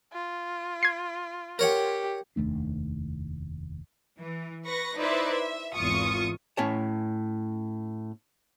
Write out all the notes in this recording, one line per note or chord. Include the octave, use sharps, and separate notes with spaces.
F4
G#6 C7
G4 A#4 C#5 F#5
F1 D#2 A3 D4
E3
B4 C#6 A#6
D#4 E4 B4 C5 D5 E5
E5
G#1 E2 F4 C#6 D#6
A2 C#4 C#5 A5